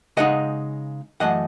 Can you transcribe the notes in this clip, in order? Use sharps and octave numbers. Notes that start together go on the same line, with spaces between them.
C#3 G#3 D#4 D#5 F#5
F#2 E3 A3 D#5 F#5